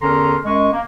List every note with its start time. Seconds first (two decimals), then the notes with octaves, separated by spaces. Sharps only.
0.02 E2 D3 C#4 A#4 A#5 C6
0.45 F#2 G#3 C#6
0.72 A#3